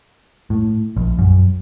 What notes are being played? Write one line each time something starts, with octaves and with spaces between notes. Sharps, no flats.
A2
A#1
F#2